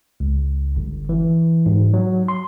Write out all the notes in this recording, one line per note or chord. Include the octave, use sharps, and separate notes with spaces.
C#2
G1
E3
G#2
F#3
C6